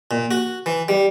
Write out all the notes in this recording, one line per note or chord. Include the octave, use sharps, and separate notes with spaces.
A#2
F#4
E3
G3